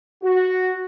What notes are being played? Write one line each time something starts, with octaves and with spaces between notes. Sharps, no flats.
F#4